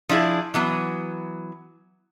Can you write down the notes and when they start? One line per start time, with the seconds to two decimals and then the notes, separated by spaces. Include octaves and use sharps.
0.09 F3 D4 E4 G#4
0.54 E3 F#3 B3